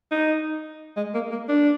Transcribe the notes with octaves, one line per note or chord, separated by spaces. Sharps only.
D#4
G#3
A#3
A#3
D4